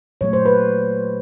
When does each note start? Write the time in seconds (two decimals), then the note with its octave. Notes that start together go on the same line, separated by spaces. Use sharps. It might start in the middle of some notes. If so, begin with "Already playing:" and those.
0.21 A#2 F#3 A3 C#5
0.33 C5
0.46 B4